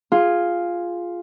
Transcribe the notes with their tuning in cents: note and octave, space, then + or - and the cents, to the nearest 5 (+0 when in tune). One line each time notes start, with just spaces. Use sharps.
F4 +0 G#4 +0